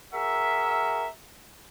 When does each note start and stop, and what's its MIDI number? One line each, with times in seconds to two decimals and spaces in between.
0.13 1.07 66
0.13 1.07 68
0.13 1.07 70
0.13 1.07 76